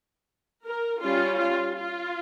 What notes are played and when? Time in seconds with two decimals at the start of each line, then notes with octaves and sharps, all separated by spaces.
0.64 A#4
1.01 G3 C#4 F4
1.39 F4
1.76 F4